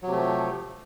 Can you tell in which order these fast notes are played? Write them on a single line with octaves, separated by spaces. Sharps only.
F#3 C3 A3 F3